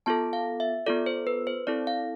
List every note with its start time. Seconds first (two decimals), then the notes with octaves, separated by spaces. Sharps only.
0.06 B3 F4 A4 A5
0.33 F5
0.60 E5
0.86 B3 F4 A4 D5
1.06 C5
1.27 B4
1.47 C5
1.67 C4 E4 A4 D5
1.87 F5